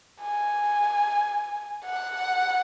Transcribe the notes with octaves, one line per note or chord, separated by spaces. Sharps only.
G#5
F#5